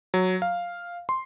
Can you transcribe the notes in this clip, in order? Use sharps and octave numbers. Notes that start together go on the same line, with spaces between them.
F#3
F5
C6